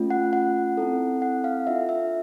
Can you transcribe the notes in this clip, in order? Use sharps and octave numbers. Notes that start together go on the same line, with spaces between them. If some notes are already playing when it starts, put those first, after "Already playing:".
Already playing: A3 C#4 F4
F#5
F#5
C4 E4 A4
F#5
F5
D4 F4 A4 E5
E5